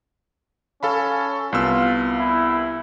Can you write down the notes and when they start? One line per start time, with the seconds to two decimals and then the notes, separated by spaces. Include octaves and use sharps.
0.83 C#4 A4 F5 B5
1.52 C2 B3 F4 E6
2.19 E4